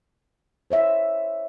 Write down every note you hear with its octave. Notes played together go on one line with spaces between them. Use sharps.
C5 C#5 E5